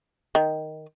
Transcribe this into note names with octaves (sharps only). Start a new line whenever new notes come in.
D#3